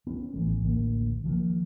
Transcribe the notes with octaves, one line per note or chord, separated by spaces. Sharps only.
B3 C#4
A1 E3 A3
A1 D2 A#3
D#3 F3 A3 A#3